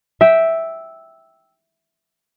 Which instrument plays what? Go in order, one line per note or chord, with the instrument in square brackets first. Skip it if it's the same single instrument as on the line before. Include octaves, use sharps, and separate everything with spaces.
[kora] E5 G5